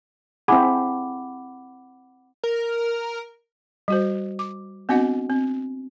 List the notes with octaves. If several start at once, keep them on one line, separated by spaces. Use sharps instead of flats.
C4 E4 G#4 F#5 B5 D6
A#4
G3 F#4 C5
D6
B3 C4 D4 F#4 D#5 F#5
C4